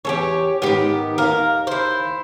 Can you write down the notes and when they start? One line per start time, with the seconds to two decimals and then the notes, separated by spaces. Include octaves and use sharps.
0.05 E2 G4 A4 C#5
0.62 G#2 D#3 B3 G4
1.18 D#2 A#4 F5
1.67 E4 C5